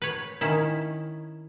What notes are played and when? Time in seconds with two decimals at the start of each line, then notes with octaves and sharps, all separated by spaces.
0.02 B4 C#5
0.41 D#3 C#4 E4